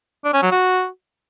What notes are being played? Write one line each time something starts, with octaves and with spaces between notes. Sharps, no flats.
D4
C#4
F#3
F#4